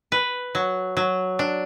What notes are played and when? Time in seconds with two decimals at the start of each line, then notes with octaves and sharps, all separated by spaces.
0.12 B4
0.55 F#3
0.97 F#3
1.39 D4